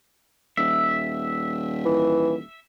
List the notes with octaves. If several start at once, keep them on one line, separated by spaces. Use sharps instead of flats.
D#1 E5
E3